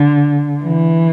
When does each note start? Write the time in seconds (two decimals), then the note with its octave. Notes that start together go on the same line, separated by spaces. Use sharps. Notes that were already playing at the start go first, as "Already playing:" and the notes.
Already playing: D3
0.63 E3